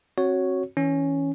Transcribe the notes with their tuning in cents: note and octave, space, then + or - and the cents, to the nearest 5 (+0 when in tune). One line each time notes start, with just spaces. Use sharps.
C4 +30 F#4 +0 C#5 +0
E3 -20 C#4 +0